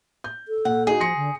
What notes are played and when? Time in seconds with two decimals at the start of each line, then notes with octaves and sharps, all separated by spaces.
0.24 G6
0.48 A4
0.65 A#2 F#5
0.87 D#4 F#4 G#4
1.00 F3 C6 A#6 C#7
1.17 D3